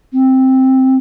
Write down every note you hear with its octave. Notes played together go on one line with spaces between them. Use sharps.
C4